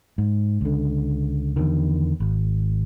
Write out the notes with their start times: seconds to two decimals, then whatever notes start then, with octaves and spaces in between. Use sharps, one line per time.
0.18 G#2
0.61 C#2 D3
1.56 E2 D3 D#3
2.20 G#1